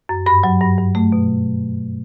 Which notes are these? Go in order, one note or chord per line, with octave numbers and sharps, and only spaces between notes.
F#2
G2 B5
F#3
G2
G2
A3
B2